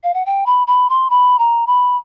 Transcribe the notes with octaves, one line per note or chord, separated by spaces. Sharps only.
F5
F#5
G5
B5
B5
C6
B5
A#5
B5